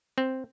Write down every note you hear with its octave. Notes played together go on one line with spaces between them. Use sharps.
C4